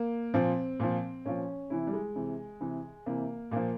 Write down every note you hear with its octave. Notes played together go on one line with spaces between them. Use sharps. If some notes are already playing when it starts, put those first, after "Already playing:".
Already playing: A#3
A#2 F3 C4
A#2 F3
A#2 F3 C#4
C3 E3 E4
G3
G#3
C3 E3
C3 E3
C3 E3 A#3
A#2 F3 A#3